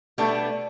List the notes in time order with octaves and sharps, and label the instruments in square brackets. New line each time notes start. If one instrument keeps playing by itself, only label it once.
[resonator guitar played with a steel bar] B2 G3 B3 D4 [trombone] A3